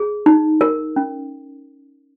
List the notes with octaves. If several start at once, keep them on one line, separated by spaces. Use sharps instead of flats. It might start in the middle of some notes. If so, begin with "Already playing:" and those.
Already playing: G#4
D#4
A#4
C#4